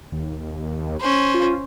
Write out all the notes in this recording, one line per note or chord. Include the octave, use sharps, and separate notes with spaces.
D#2
C#4 C5
F4